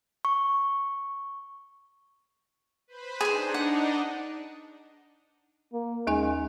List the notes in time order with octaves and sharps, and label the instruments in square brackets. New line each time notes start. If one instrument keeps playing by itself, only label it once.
[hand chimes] C#6
[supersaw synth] B4 C5 B5
[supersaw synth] D4 D#4 [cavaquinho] G#4 C5
[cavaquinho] F#5
[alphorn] A#3
[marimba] D#2 D#4 G#5 [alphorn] G#3